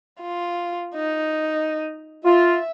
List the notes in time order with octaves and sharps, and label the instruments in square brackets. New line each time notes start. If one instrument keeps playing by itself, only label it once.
[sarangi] F4
D#4
[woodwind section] F4 [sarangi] E5